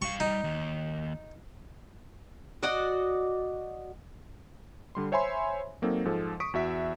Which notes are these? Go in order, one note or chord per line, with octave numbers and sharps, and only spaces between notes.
G3 F5 C#6
G3 D#4
D#2
F#4 D5 D#5 F#5
D3 G3 C6
C5 C#5 E5 G#5 B5 C6
F#3 A#3 C4 D#4 A4
G#2 F3 A4
C#6 D#6 B6 D7
E2 F#4 E5 B6